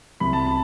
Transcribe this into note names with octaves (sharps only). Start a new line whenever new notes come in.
C2 B5
A5
B5